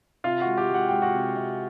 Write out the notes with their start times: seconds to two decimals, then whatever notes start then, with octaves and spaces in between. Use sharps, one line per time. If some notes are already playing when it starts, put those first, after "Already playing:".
0.24 C3 F4 F5
0.41 G#3 F#4 F#5
0.58 G4 G5
0.70 G#3 F#5
0.88 G#3 G5
1.02 F#4 F#5
1.14 C3
1.36 C3